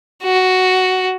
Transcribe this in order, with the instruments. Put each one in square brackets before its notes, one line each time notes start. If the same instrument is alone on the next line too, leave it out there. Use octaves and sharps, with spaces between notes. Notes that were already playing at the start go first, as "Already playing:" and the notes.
[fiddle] F#4